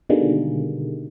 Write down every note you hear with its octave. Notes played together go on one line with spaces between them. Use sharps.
B2 D3 D#3 G3 G#3 A#3